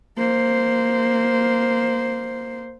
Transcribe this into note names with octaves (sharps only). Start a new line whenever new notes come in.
A#3 C5